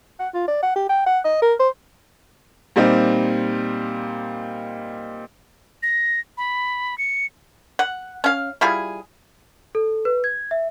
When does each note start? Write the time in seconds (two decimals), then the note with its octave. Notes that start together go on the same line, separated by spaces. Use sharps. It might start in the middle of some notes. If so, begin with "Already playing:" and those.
0.20 F#5
0.34 F4
0.48 D5
0.63 F#5
0.75 G4
0.89 G5
1.06 F#5
1.25 D#5
1.42 A#4
1.59 C5
2.76 A#2 G3 C4 D#4
5.83 A#6
6.38 B5
6.98 C#7
7.79 F#5
8.24 C#4 F5
8.61 G3 E4 F4 G#4
9.75 A4
10.05 B4
10.24 G#6
10.51 E5